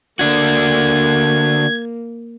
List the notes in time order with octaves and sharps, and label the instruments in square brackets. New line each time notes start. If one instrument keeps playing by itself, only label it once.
[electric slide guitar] D3 D4 F#4 [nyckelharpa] A#3 [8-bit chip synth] G#6